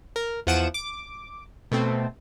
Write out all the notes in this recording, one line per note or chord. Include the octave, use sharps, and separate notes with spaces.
A#4
E2 F3 F#5 D#6 D7 E7
D6
B2 A3 C4